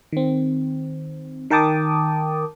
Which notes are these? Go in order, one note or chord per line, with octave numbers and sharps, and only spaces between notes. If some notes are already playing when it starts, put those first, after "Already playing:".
D#3 C4
D#3 A#4 G5 A5 D6 D#6